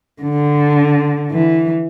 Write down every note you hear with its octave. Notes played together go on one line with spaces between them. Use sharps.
D3
E3